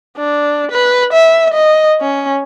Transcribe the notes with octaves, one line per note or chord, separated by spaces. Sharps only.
D4
B4
E5
D#5
C#4